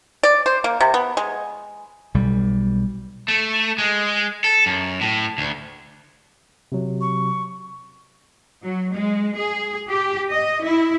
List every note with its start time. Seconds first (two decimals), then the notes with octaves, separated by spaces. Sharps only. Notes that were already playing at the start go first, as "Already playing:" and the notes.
0.23 D5
0.46 C5
0.64 A#3
0.81 C3
0.94 B3
1.17 G#3
2.14 B1 G3
3.28 A3
3.78 G#3
4.44 A4
4.66 F#2
5.01 A2
5.38 D2
6.72 C3 F#3
7.01 C#6
8.64 F#3
8.95 G#3
9.38 G#4
9.89 G4
10.31 D#5
10.64 E4